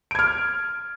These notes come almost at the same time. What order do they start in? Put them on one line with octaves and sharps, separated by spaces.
D7 G#6 F6